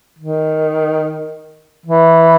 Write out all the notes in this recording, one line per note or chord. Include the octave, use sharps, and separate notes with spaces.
D#3
E3